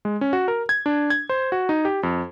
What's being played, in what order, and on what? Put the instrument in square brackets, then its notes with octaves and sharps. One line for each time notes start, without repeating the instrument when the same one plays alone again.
[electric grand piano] G#3
C#4
F#4
A#4
G#6
D4
G#6
C5
F#4
D#4
G4
F2